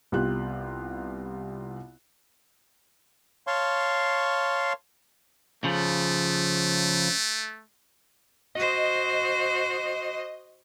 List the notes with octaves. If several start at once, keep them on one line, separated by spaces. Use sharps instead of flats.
C2 B3 F4 G4 F#6
C#5 F5 A5 C6 C#6
C#3 F3 A3
F#4 C5 D#5